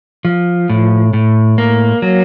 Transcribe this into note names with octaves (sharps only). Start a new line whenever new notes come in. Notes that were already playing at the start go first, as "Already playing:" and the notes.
F3
A2
A2
A#3
F#3